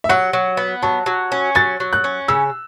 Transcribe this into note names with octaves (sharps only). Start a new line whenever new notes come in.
E5
F#3 F#5
F#3
B3
F#3 A5
F#3
C#4
F#3 A6
F#3
F#6
C#4
C#3 E6